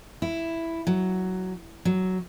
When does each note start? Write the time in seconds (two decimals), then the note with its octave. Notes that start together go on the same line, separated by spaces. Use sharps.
0.22 E4
0.87 F#3
1.85 F#3